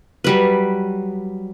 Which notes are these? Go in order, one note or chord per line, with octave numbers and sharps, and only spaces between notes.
F#3 G3 B4